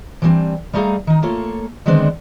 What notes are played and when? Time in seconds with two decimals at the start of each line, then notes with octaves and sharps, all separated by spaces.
0.22 E3 F3 G3 A3 C4 D4
0.73 G3 A3 D#4 G#4 F5 A#5
1.07 D#3 D#4
1.22 A3 A#3 F4 A4 C#5
1.86 D3 D#3 G#3 B3 C4 D4